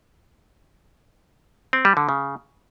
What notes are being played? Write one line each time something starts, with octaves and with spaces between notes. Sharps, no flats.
C4
G3
D3
C#3